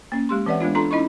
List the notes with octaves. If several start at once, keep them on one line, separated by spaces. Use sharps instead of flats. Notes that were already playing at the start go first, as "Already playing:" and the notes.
A#3 C#4
G#3 G4 C6
E3 C4 B4 D5 E5 F#5
G#3 B3 D4 F4
D4 F4 A4 A#5 C6
C#4 D#4 E4 D#5 B5 C#6